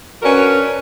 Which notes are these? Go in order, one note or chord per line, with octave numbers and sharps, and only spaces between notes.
C#4 D4 F#4 A#4 B4